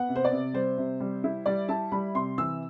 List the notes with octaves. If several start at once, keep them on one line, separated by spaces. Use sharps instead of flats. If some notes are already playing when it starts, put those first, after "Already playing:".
Already playing: B3 F#5
C3
C5
D5
C3
G3 C5
C3
G3
E4
G3 D5
E4 A5
G3 B5
C3 C6
E3 E6